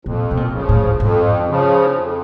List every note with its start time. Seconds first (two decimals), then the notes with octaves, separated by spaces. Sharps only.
0.05 F2 A#2
0.31 B2
0.37 A#2
0.52 C#3 F3
0.69 A2
1.00 F2 G#2
1.48 C#3 F3
1.95 F2